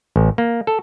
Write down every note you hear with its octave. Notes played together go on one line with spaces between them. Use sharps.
A1
A#3
A4